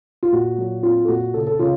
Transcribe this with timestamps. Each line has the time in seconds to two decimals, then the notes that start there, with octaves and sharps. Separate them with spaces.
0.23 F4
0.32 A#2 F#4
0.58 F#3
0.83 C4 F4
1.05 A4
1.08 A#2 F#4
1.34 C#3 A4
1.47 A4
1.59 C#3 F4